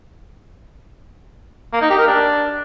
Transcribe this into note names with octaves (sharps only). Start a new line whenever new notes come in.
A#3
D#4
G4
A#4
D4